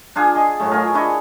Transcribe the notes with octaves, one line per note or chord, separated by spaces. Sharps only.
D4 F4 G#4 G#5
D#5
A2 F#3 A3
F4 G#4 A#4
D4 E4 C#5 D#5